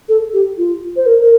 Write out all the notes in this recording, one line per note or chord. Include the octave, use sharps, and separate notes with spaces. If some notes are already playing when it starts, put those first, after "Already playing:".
A4
G4
F4
C5
A#4
A#4